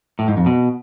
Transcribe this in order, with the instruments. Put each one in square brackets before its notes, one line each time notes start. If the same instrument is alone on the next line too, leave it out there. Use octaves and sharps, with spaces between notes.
[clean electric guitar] A2
G#2
F2
B2